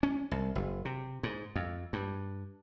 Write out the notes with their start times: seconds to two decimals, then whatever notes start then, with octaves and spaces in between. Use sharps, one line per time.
0.03 C#4
0.31 C2
0.55 F#1
0.85 C3
1.23 G#2
1.56 F2
1.93 G2